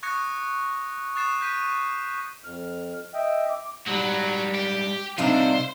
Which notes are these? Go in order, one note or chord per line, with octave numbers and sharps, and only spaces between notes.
C#6 D#6 F#6 G#6 A#6 C#7
C#6 D#6 F#6 A6 C7 E7
G6 B6 D#7
F2 F6
D#5 E5 G5
D6
G#2 F#3 G3
G4
C2 C3 D4 D#4 C5 F5